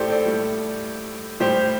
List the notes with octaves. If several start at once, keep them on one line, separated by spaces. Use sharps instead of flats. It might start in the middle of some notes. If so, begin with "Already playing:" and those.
Already playing: A2 G4 A4 C5 D5
A4 D5
A2 G3
A2 G3 G4 C5